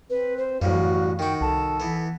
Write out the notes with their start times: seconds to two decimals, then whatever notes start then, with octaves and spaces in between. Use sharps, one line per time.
0.10 C4 B4
0.38 C5
0.62 A1 F#2 A2 G3 F#4 F5
1.19 D#3 F#4 G5
1.41 C2 A4 A5
1.80 E3 B3